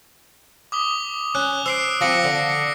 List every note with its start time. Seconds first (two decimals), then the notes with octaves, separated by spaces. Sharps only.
0.72 D6 D#6 G7
1.35 C#4 F#6
1.66 C5 E6 C7 D7
2.01 F3 C4 D6 A#6 C#7
2.24 D3
2.50 C#7